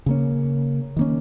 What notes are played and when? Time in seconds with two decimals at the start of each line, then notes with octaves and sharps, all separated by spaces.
0.06 C#3 A#3 C#4
0.97 D#3 A#3 C#4